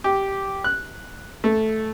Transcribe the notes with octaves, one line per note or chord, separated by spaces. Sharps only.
G4
F#6
A3